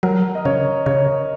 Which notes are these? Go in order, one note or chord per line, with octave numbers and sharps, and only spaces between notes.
F#3 A#4
D#5
C#3 C#5
C#3 C#5
D#5